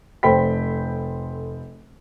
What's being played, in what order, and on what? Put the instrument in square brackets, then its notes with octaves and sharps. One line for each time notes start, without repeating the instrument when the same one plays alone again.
[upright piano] F1 A4 C5 G5 B5 B6